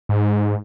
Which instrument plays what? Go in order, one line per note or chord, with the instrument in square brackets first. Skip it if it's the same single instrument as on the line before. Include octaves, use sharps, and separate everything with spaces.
[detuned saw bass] G#2